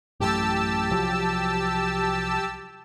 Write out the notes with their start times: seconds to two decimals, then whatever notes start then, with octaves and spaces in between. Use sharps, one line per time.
0.20 A1 F#2 A2 G4 A5 E6
0.91 C2 F3 F#3